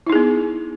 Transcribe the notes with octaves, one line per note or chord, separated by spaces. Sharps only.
B3 D#4 E4 G#4